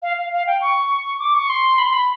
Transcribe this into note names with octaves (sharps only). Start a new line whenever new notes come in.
F5
F5
F5
G5
C#6
D6
C#6
C6
B5
C6
B5